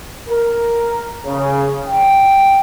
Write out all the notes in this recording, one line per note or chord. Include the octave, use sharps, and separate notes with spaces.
A#4
C#3
G5